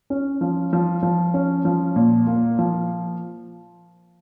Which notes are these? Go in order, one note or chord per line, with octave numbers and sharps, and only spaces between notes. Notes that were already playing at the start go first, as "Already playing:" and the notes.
C#4
F3
F3
F3
C#4
F3
A#2
A#3
F3